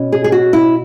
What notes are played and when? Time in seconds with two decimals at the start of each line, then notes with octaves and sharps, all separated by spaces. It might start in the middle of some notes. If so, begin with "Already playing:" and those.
Already playing: B2 C#4
0.12 G#4
0.24 G#4
0.32 F#4
0.53 E4